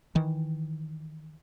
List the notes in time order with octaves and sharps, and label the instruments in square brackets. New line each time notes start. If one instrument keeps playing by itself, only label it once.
[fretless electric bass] D#3 E3